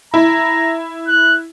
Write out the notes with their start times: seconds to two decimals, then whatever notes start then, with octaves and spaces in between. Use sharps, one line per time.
0.14 E4 A#5
1.08 F#6